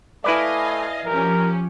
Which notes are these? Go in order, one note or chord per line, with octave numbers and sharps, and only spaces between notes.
A3 E4 B4 D5 D#5 F5 G#5
F3 C#4 G4 A#4